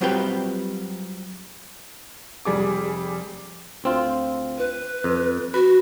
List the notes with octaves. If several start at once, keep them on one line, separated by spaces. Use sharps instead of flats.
F#3 G3 C4 F4 B4 G5
F1 G3 G#4 D6
D2 C4 F4
B4
F2
F#4 B4